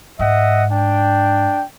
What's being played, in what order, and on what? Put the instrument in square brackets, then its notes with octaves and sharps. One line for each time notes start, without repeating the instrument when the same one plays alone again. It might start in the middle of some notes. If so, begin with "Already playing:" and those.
[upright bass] G#2 [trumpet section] D#5 E5 F#5
[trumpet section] D4 G5